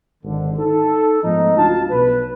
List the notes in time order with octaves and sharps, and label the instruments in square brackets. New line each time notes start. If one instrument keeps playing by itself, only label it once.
[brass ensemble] G#1 D3
D#4 A4
G#2 F3 A3 B3 D#4
C#2 D4 F4 F#4 F5 A5
B1 B4